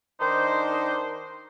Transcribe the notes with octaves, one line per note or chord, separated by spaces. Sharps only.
D#3 D4 D#4 C5